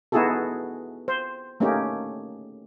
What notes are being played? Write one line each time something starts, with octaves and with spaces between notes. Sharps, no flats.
B3 D#4 E4 F#4 G#4 A4
C5
A3 A#3 C#4 D#4 G4